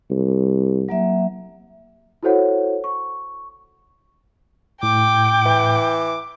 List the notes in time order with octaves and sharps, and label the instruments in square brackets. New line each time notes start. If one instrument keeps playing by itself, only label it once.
[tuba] C2
[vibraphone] F#3 A#3 E5
[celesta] E4 F#4 A4 C5 C#5 F#5
C#6
[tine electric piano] A2 [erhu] G5 [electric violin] D6
[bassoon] E3